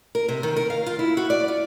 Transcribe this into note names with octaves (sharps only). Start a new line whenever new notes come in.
A#4
C3
D#3
A#4
F5
F4
E4
F#4
D5
F4